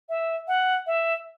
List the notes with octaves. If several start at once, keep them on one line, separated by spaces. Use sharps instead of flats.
E5
F#5
E5